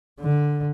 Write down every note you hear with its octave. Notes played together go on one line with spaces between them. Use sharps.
D3